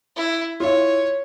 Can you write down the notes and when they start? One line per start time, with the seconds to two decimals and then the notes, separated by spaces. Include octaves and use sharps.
0.16 E4
0.60 E4 F4 C#5